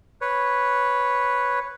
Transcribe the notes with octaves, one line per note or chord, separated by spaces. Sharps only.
B4 C#5